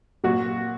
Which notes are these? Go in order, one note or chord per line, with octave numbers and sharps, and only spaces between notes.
A#2 F#3 F#4